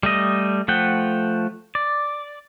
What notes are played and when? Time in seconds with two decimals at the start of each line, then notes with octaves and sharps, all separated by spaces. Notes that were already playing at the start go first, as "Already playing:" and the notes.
0.03 G3 A3 D#5
0.68 F3 A3 F#5 G5
1.75 D5